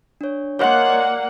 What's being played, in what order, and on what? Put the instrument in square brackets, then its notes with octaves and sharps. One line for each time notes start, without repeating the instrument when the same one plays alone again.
[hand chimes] D4 C#5
[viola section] A#3 F#5 [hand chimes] C#5 D#5 C6
[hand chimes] D5